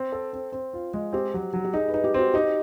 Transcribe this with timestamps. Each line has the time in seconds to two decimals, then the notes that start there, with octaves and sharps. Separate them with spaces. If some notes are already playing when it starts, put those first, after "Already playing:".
Already playing: C4
0.12 A4
0.33 C4
0.52 C4
0.74 F4
0.94 G#3
1.13 C4 G4
1.34 F#3
1.54 F#3
1.64 G4
1.73 D#4 G#4
1.88 B4
1.94 D#4
2.04 G4
2.14 C4 F#4
2.34 D#4 G4